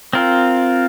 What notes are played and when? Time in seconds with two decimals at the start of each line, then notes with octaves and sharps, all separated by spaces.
0.13 C4 F4 A#4